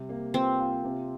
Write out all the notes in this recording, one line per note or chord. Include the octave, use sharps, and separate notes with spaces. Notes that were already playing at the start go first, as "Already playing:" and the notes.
Already playing: C3 G3
A#3
C4 F4
F4
C3